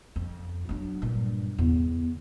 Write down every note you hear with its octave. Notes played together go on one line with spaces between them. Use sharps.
F2
F#3 D4
G2 A#2
E2 D3